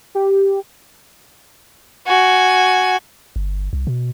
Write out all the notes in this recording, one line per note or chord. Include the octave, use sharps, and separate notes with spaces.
G4
F#4 G#5
G1
C2
B2